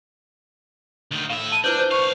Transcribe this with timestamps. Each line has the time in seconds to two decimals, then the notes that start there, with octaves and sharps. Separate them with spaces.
1.11 D2 D#3
1.30 A2 E5 F5
1.52 A5 D#7
1.64 D4 E4 B4 C5 G6
1.79 C5 G6
1.91 B1 F5 C#6